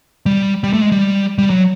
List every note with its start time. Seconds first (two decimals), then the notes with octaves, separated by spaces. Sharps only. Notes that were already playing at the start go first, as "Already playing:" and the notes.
0.26 G3
0.64 G3
0.73 A3
0.82 G#3
0.92 G3
1.38 G3
1.50 F#3